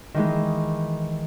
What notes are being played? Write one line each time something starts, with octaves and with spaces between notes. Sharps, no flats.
D#3 E3 G#3